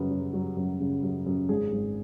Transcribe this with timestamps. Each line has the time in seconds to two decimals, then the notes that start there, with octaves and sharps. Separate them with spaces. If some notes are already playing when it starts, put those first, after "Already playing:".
Already playing: F#2 C#3 B4
0.11 F#3
0.34 F#3
0.57 F#2
0.80 C#3
1.03 F#2
1.26 F#2
1.49 G#1 G#4
1.72 G#1